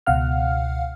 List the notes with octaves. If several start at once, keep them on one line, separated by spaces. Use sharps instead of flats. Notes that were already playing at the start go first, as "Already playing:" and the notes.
C#2 B2 F5 F#5 F6